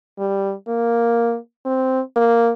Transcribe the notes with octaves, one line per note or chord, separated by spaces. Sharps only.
G3
A#3
C4
A#3